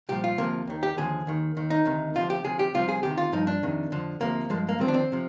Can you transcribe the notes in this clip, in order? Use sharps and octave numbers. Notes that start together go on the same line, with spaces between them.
C2 A#2 F3 G4
F4
D2 C3 F3 A#3
D#2 D#3
G4
D#2 D3 F3 G#4
D#2 D#3
D#2 D#3
D#4
D2 C3 D#3
D2 C3 F3 F4
G4
D2 C3 F3 G#4
G4
C2 C3 F3 F4
G#4
D2 C3 D#3 G4
F4
G2 F3 D#4
D4
F2 C3 D#3
F2 D3 F3
D2 C3 F3 A#3
G2 F3 G#3
A#3
D#2 D3 F3 C4
D4
C4
C3 F3